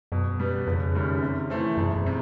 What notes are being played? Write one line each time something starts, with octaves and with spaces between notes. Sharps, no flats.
F#2 B2
G3 B3
F#1 F2
F#2 D#3 G3
C3
E3 A3 C4
E1 F#2
F#2
C3